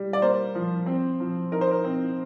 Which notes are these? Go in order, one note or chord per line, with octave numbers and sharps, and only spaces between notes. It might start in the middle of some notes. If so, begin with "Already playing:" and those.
Already playing: G3
D5
A#3 C5
F3
C4
F3
D#4 A#4
C5
A#4
C4